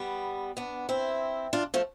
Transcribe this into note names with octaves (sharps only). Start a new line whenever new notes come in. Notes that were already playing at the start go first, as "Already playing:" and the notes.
Already playing: G3 B3
B3 D4
C4 E4
D4 F4
F3 A3